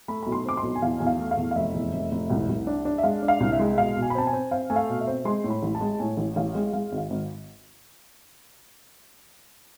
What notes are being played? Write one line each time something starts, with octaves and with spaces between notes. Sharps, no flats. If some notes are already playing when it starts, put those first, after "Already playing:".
A3 B5
B1 B5
C6
C4 D6
C6
B1
G#5
E2 F5
E2 G#5
F5
A3
F5
E2
F5
F1 E5
E2
F1
F1
C2
C2
D4
D4
E5
G#3 F5
D4
F5
C2
E5
G#3
B2 F5
B2
G#5
B5
C4 A5
G#5
C4
C4 F5
A3 G#5
F5
B2
E5
C4
G#3 C6
A2
B5
A1
A5
G#3
A2 G#5
A1
A1 F5
G#3
G#3 F5
G#1
F5
G#1